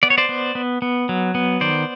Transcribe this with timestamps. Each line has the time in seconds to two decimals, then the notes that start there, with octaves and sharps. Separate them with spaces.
0.03 B3 D5
0.10 C#5
0.18 C5 D5
0.29 B3
0.55 B3
0.82 B3
1.09 F#3
1.35 B3
1.61 D#3 C5 D5